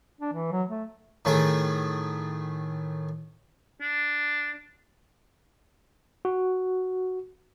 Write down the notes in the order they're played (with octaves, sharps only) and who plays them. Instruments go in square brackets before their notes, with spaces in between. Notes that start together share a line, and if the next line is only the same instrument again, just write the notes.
[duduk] D4
E3
F#3
A3
[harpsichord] A2 D#3 A3 G#4
[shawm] D4
[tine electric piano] F#4